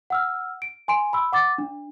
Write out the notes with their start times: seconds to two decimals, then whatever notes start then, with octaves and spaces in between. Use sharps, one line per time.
0.10 F#5 E6 F6
0.62 D7
0.88 G#5 C6 D7
1.13 B5 E6
1.32 F#5 D6 A6
1.58 D4